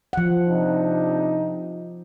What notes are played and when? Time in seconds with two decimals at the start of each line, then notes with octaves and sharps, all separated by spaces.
0.13 F3 F#5
0.47 C3 D4 D#4